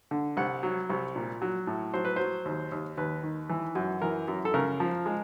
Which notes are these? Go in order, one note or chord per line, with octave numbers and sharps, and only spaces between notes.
D3
C2 F#5
F#3
C2
A#2
F#3
A2
F#3 C5
B4
F#3 C5
D#2
D#2
D#2 B4
D#3
E3
F#2
E3 A#4
F#2
A4
C#3 A#4
F3
G#3